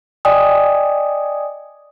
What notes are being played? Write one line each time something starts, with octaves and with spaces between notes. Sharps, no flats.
D5 D#5 G5 G#5 D#6